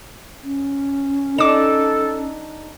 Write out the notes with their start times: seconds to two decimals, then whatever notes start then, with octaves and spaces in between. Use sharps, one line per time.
0.43 C#4
1.38 D4 D#4 A4 D6 E7